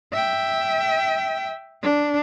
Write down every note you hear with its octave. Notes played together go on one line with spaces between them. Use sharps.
E5 G5
D4